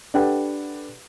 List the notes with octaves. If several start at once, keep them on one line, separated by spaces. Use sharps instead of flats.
D4 G4 A4 B4 F#5 G5